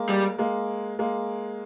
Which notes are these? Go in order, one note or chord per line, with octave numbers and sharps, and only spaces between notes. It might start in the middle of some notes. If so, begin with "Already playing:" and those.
Already playing: G#3 A#3
G3
G#3 A#3
G#3 A#3